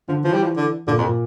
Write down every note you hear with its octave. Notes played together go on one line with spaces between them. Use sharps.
D3 F3
E3 F3
G3
F3
D3
A#2 D3
F2
A#2